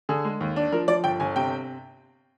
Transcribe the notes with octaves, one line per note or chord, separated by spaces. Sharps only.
D3 G#4
G#3
D#2
D4
F3 A#4
F3 D5
G1 G5
G1 G#5
C3 G5